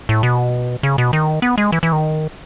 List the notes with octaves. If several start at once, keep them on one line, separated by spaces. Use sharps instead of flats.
A2
B2
C#3
B2
D#3
B3
G#3
E3
E3
D#3